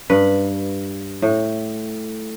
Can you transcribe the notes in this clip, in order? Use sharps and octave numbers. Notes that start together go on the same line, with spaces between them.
G2 B4
A2